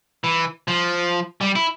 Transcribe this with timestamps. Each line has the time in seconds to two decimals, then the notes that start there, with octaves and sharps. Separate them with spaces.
0.24 E3
0.68 F3
1.41 G3
1.56 E4